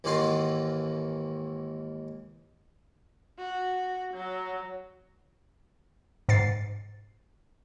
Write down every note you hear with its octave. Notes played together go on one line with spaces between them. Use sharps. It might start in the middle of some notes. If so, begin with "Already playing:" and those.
D#2 G#2 D#3 E3 F4 F5
F#4
F#3
G#2 A6 C7